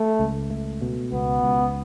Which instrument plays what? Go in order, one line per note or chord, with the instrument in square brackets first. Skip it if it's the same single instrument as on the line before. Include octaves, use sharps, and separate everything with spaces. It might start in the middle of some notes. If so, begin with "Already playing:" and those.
Already playing: [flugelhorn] A3
[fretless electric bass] C#2
A3
B2
[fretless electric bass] C#2 [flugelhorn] B3
[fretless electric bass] C#2